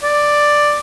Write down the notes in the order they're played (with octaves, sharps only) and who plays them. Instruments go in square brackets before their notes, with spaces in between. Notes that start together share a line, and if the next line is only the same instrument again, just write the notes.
[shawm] D5